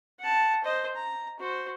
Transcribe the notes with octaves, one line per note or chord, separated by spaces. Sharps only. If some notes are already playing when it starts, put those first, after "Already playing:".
F#5 A5
C5 D#5
A#5
F#4 C5